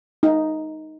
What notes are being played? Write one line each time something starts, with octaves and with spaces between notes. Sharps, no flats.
D#4